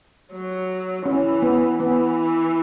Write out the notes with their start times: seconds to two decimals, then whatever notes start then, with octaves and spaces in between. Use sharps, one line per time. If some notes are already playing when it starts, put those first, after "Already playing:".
0.33 F#3
1.06 E3 C#4
1.42 B3
1.80 E3 B3